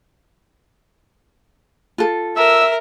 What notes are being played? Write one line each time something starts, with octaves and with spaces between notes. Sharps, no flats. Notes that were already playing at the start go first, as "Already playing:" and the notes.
F4 A4
A#4 E5 E6